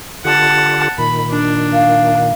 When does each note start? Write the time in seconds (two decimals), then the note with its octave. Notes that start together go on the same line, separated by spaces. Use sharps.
0.25 D3 F4 G4 F#5 A5
0.98 A#2 D#3 B5
1.31 D4
1.74 F5